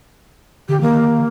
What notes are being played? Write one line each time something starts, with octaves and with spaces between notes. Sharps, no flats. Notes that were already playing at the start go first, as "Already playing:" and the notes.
D3 G4
D#3 A#3